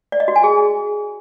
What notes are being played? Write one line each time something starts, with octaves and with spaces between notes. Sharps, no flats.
D5
D#5
F#4
G#5
G#4